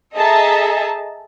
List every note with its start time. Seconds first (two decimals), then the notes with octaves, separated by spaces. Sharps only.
0.14 G#4 A4 D#5 E5 A5 A#5